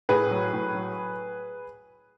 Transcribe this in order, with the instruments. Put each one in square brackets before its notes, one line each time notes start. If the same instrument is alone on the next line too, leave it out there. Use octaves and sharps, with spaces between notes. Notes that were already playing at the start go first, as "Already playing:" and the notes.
[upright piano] A2 G#4 B4
F#3
A2
F#3